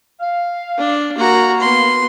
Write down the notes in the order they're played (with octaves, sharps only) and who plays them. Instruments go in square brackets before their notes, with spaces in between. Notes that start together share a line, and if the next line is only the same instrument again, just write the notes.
[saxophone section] F5
[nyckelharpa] D4
[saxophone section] A#3 [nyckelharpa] F#4 A#5
[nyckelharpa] B3 C6